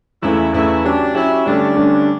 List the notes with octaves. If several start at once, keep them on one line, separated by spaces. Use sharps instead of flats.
E2 C#3 E3 A3 E4
E2 C#3 E3 A3 E4
F#3 C#4 D4 G4
F#3 C#4 E4 G4
G2 D3 A3 C#4 D4 G4
G2 D3 A3 C#4 G4